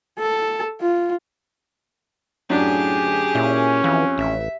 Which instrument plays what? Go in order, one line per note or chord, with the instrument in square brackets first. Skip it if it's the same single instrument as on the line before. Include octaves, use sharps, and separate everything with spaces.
[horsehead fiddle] A4
F4
[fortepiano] F#2 D4 [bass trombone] A2 [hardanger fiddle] G4 G#4
[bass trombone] D2
[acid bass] A#2 [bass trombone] C#4 [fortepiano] E4
[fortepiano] F2 [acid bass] E3
[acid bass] A1 [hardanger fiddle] E5